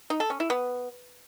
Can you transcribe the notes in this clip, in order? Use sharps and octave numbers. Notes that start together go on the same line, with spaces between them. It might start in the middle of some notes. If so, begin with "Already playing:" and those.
D#4
A4
C#4
E4
B3